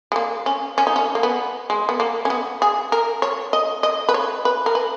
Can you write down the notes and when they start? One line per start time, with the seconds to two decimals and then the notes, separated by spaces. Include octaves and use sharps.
0.12 G#3
0.16 A#3
0.46 C#4
0.78 C#4
0.87 D#4
0.96 C#4
1.15 A#3
1.23 B3
1.70 G#3
1.89 B3
2.00 A#3
2.25 C#4
2.30 B3
2.62 G#4
2.92 A#4
3.22 C#5
3.53 D#5
3.83 D#5
4.09 B4
4.14 C#5
4.45 B4
4.66 A#4
4.75 B4